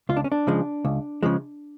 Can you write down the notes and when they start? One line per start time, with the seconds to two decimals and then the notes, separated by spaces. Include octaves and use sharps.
0.09 C#2 F4
0.17 D4
0.24 C#4
0.32 D4
0.47 C#3 F3 G#3
0.85 C#2
1.23 C#3 F3 G#3